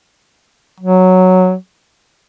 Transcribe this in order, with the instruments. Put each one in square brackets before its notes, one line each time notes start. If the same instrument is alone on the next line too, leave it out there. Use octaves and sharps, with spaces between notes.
[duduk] F#3